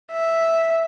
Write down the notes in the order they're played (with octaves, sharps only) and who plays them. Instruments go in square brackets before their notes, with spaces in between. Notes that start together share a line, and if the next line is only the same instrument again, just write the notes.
[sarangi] E5